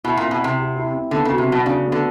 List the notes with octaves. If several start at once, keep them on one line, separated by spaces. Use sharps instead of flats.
B2 E4
A#2
C4
B2
C3 C4
G4
E4
C4
D3 B3
C#3
F#4
C3
B2 F#3
C#3 D4
B3
D3